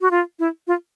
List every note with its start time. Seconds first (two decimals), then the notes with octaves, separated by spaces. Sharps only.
0.01 F#4
0.11 F4
0.39 E4
0.67 F4